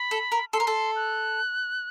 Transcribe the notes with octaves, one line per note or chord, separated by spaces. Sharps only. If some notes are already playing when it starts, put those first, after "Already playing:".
Already playing: B5
A4
A#4
A4 C6
A#4
A4
F#6